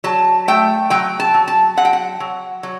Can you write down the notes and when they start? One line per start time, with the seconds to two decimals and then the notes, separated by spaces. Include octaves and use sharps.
0.04 F#3 A5
0.48 A3 G5
0.90 F#3 G5
1.20 A5
1.34 F#3
1.48 A5
1.77 F#3 F#5
1.85 G5
1.93 F#5
2.20 F#3
2.63 F#3